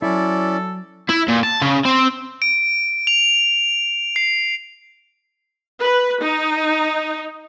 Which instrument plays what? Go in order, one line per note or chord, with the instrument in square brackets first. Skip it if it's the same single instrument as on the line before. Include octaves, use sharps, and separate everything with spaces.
[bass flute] F#3 [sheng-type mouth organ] C#4 D5 [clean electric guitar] E4 [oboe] A4
[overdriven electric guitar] E4
A#2
A5
C#3
C4
[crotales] D7
F7
C7
[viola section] B4
D#4